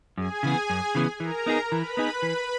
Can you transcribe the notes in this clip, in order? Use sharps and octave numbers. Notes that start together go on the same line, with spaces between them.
F#2 G#4 G#5
C#3 E3 B3
F#2
C#3 E3 B3
E3 A#4 A#5
B3 D#4 G#4
E3 B4 B5
B3 D#4 G#4
E3